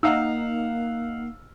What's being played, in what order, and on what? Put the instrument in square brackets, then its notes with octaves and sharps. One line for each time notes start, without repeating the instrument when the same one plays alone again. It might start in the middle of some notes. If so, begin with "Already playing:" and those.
[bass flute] A#3 [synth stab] D#4 [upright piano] F5 F#5 E6